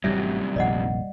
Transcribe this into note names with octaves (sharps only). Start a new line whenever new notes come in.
A1 F#2 C3 E3 F#3 G3 E5
F1 A#1 D#3 D5 D#5 F#5